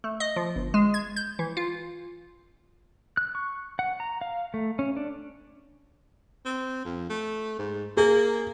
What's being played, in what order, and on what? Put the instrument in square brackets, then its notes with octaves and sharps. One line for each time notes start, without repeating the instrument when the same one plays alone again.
[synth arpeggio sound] A3
D#5
F3
G1
G#3
G#6
G6
E3
F4
[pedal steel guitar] F#6
C#6
F#5
A#5
F5
A3
C#4
D4
[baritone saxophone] C4
F2
A3
G#2
[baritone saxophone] A#3 [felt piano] G#4